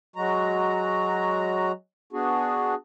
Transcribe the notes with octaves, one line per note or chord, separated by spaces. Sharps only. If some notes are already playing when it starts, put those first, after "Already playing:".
F#3 G#3 F#4 A#5
B3 D4 F#4 G#4